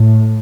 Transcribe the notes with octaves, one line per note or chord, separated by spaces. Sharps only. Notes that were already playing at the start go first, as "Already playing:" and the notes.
Already playing: A2